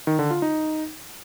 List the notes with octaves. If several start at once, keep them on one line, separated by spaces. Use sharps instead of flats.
D#3
D3
F4
D#4